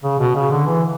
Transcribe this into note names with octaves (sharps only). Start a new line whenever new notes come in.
C#3
B2
C#3
D3
E3